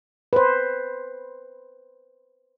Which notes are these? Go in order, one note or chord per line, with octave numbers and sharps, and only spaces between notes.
B4 C5